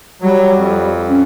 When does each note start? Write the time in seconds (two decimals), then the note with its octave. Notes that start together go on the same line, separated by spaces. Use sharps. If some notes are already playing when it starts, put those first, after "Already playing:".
0.22 F#3 G3
0.56 F2
1.08 C#4